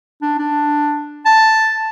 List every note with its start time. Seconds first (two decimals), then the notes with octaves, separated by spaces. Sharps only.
0.22 D4
0.39 D4
1.26 A5